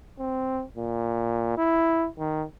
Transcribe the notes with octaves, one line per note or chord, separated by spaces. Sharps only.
C4
A#2
E4
D#3